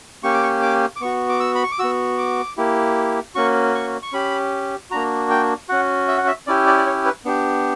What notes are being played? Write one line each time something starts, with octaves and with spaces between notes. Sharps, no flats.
A#3 C#4 G4 C#6
D6
C#6
D6
D6
B3 F#4 C#6
D6
E6
B5
C#6
D6
B3 F#4 E6
D6
A#3 E4 G4
A#3 C#4 F#4 C#6
C#6
C#6
C#4 G4 B5
A#3 D4 F#4 A#5
G5
C#4 F#4 F#5
E5
F#5
E5
C#4 E4 G4 D5
D5
D5
C#5
B4
B3 D4 G4